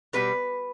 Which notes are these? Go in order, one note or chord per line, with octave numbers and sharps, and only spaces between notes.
B2 G3 B4